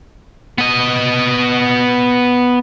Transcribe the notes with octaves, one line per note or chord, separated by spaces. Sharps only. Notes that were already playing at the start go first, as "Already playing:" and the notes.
B3 D#5